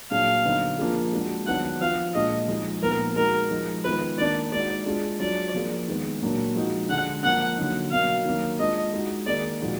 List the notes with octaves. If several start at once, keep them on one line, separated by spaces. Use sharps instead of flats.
A#2 F#3 D4 G#4 F5
D3 F#3 B3 D#4
F3 A#3 D4 F4 G#4
G#3 D4 F#4
D#3 F#3 B3 D4 F#5
F3 B3 F4 F5
A#2 G#3 D4 F4 D#5
F3 G#3 D#4 G#4
A#2 F3 B3 D#4 A#4
G#3 D#4 F#4 A#4
F3 G#3 D#4
D#3 G#3 B3 F4 G#4 B4
D#3 A#3 D4 D5
G#3 D#4 F#4 D5
G#3 D4 F4 G#4
F#3 D4 F4 D5
F3 A#3 F4 G#4
D#3 G#3 B3
A#2 F#3 A#3 D4
F3 G#3 D#4 F#4
D3 G#3 D4 F#5
F3 A#3 D4 F#5
D3 F#3 A#3 D#4
B2 F#3 A#3 F5
D#3 F#3 A#3
G#3 D4 F4 D#5
G#3 D#4 F#4
D#3 A#3 D#4 G#4 D5
A#2 F3 G#3 D#4 F#4